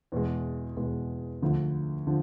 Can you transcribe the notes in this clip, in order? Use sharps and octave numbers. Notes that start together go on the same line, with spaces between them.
E2 B2 G#3
E2 B2 G#3
D2 D3 F3
D3 F3